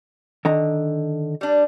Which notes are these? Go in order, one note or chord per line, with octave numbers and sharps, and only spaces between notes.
D3 D#3 A#5
G3 D4